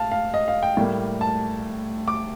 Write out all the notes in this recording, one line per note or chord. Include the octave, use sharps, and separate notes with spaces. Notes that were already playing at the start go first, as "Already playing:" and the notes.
Already playing: A2 F5 A5
F5
D#5
F5
G5
A2 G3 A#3
A5
D6